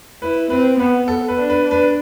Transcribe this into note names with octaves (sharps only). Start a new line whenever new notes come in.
E4 B4
C4 B4
B3 B4
A4
B4
D4
B4
D4
B4